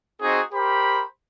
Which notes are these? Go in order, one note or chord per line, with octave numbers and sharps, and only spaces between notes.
C4 D#4 F#4 G#4
G4 A#4 C5 B5